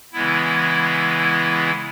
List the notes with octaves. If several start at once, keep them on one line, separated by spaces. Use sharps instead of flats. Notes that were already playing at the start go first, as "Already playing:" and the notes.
C#3 E3 G#3 B3 E4